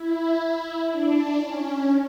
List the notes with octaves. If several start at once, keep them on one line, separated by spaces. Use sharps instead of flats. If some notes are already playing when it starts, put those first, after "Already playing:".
Already playing: E4
D4
C#4